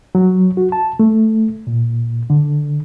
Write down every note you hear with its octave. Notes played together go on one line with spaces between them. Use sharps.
F#3
F#4
A5
A3
A#2
D3